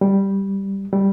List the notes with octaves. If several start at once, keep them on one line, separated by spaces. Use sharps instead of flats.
G3
G3